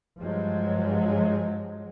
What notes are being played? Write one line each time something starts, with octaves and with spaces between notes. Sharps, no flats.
G2 F3 F#3 G#3